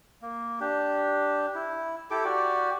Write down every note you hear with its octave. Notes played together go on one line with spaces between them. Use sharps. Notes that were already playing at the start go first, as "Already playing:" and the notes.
A#3
D4 G4
E4
E4 G4 A4 D6
F#4 G4 D5